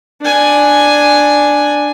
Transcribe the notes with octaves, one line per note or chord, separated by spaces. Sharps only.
D4 G#5